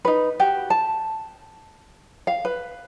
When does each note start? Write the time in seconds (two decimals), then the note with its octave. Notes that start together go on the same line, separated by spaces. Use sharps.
0.05 D#4 B4
0.39 F#4 G4
0.70 A5
2.27 F5
2.45 B4